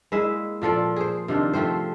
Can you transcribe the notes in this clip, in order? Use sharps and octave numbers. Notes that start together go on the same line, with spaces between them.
G#3 A#3 E4 E5
A#2 F3 A4 D5
G#4 C5
C3 D#3 F3 D4
F3 A3 C4 C5